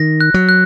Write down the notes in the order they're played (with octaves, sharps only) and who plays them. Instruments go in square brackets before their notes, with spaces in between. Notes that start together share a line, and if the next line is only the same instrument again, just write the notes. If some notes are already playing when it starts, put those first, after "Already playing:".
Already playing: [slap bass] D#3 [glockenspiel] A#6
[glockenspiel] F#6
[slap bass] F#3
[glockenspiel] F#6